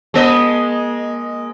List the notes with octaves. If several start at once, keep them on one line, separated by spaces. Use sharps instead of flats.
G#3 A#3 D#5